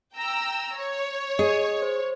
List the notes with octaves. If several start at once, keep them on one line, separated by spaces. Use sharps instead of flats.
G5 A#5 E6
C#5
G#4 D#5
C5